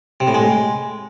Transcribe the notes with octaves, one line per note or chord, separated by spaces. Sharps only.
C3
A2
G#3